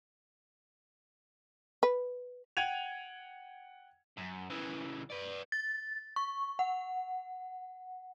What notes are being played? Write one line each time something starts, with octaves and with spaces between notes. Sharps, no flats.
B4
F#5 G5 G#6 D#7 F7
F#2
C#3 E3
B4 D5
A6
C#6
F#5